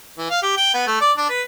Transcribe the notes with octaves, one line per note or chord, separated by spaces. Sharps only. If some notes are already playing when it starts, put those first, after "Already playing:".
E3
F5
G4
G5
B3
A3
D5
D4
B4